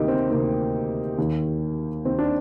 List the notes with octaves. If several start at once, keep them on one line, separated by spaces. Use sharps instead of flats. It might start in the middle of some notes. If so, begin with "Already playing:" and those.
Already playing: D2 C3 D#3 A#3 D#4 G4
C4
D2 C3 D#3 A#3
D#2 D#3
D#2 D#3 C4
D4